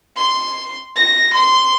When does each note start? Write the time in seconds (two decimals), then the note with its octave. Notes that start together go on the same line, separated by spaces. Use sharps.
0.17 C6
0.96 A#6
1.33 C6